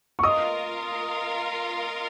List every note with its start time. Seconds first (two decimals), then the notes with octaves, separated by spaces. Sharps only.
0.19 C#6
0.23 F4 A#4 D#5 F5 D#6